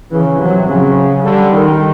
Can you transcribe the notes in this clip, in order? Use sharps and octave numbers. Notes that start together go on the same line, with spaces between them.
C#3 E3
C3 F#3
C#3 F#3
D3 G3
D#3